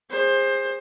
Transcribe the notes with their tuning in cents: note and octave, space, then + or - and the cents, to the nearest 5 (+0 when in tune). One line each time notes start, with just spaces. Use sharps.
G#4 -30 C5 +20